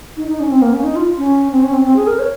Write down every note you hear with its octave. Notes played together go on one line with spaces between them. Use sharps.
D#4
D#4
C#4
C4
A#3
C#4
D#4
F4
C#4
C4
C#4
C4
C4
G#4
A#4
C#5